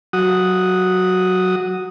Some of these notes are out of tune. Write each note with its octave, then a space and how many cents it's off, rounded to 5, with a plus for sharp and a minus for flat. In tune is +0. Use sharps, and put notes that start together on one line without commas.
F#3 +0 F#4 +0 D#6 +0